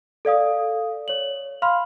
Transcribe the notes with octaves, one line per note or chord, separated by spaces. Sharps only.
A4 D5 F5 D#6
C#5 F#7
F5 B5 C6 F6